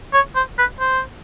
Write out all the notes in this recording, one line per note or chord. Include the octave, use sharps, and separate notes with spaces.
C#5
C5
B4
C5